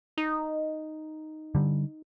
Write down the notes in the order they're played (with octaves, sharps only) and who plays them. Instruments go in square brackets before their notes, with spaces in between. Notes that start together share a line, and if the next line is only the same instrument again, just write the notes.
[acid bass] D#4
[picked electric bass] D3 G3